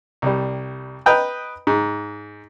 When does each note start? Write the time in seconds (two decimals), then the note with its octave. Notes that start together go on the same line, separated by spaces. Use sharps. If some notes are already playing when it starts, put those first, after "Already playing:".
0.22 C2 G3
1.06 B4 D#5 G5 A#5
1.67 G#2